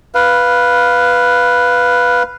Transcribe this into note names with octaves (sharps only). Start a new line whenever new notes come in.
B4 F5